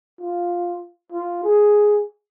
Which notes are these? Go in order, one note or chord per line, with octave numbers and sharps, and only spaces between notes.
F4
F4
G#4